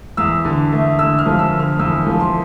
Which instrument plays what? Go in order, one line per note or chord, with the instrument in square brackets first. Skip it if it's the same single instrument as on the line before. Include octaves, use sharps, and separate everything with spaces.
[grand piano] E2 E6
D3
A3
D3 E6
F6
F3
E6
D3
F6
E2 E6
F3
C6